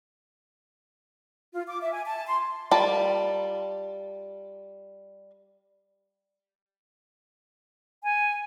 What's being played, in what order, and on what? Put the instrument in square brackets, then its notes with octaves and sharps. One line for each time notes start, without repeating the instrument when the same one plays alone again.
[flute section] F4
D6
E5
G#5
A5
C6
[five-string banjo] G3 F4 A#4 A5 B5
[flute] G#5